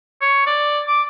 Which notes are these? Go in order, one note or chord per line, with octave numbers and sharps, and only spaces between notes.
C#5
D5
D6